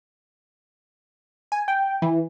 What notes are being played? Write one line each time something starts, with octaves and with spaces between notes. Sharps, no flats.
G#5
G5
E3